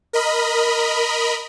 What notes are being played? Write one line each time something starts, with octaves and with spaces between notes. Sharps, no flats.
A#4 D#5 B5